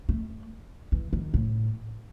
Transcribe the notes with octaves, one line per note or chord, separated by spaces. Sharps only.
A3
E3
D#3
A2